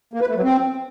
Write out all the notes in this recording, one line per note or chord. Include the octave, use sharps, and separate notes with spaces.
A#3
B4
A3
F#3
C4